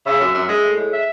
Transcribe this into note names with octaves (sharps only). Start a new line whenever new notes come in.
C#3 E5
F#2
F#2
G#3
A2
G#3
E5